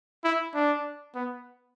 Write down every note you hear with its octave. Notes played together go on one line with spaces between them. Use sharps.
E4
D4
B3